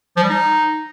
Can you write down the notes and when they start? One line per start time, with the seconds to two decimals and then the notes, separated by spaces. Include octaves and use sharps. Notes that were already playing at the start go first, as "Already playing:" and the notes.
0.17 F3
0.23 G3
0.29 D#4